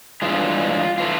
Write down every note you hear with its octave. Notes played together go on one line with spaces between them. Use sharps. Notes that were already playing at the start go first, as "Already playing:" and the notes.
G2 E3 G#3 F4
E3 A3 F4